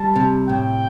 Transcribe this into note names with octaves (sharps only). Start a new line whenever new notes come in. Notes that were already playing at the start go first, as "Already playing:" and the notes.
Already playing: G3 A5
C3
A2 G5